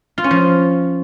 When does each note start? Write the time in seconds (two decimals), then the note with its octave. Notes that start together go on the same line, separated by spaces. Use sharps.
0.18 F4
0.24 C#4
0.31 F3